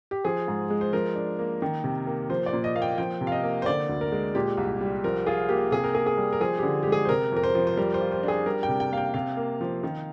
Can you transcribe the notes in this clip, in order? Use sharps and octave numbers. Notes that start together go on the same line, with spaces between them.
G4
F3 G#4
G#2
G#3
C5
F3 A#4
D4
A#3
D#3
C3
A#3
F3 C5
D5
A#2
D#5
A#3 F5
G5
F3 G5
C3
F5
D#5
A#3
C5
D3 D5
D2
A#4
G#3
A#2 G4
C2
G3
F3 A#4
F4 G#4
A#3 G4
C3 G#4
A#4
A#3 G#4
G#4
G3
A#4
F3 G#4
D3 G4
G#3 G4
G#4
C5
C3 A#4
F2 A#4
C5
F3
C5
G3 A#4
C5
F4
C5
D4 G#4
G3 A#4
G5
C3
G5
A#3 F5
G5
C3 F5
A#3
F3
D#3